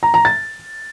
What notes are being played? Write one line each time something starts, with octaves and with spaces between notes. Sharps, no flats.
A#5
A#5
A6